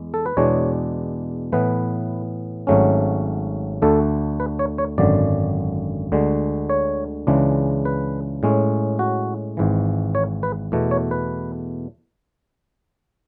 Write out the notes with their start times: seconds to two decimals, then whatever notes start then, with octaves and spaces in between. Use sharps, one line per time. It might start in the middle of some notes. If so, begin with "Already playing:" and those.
Already playing: E2 G#3
0.14 A4
0.26 B4
0.37 E2 B2 G#3 D4 C#5
1.52 A2 E3 B3 B4
2.67 G#1 G#2 F#3 A3 C#4
3.82 D2 D3 A3 D4 A4
4.40 B4
4.59 C#5
4.78 C#5
4.98 G#1 F#2 D3 D5
6.12 D2 D3 G#3
6.70 C#5
7.27 C#2 C#3 E3 G#3 D4
7.85 B4
8.43 A2 G#3 C#4
8.99 F#4
9.57 G#1 G#2 E3
10.15 C#5
10.43 B4
10.72 E2 B2 A3
10.91 C#5
11.11 B4